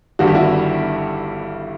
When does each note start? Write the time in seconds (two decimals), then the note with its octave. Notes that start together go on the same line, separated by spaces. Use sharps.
0.19 G1 G2 D#3 G3 F#4
0.27 G4
0.35 E4 F#4